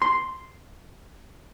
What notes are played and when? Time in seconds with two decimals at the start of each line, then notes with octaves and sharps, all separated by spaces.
0.02 C6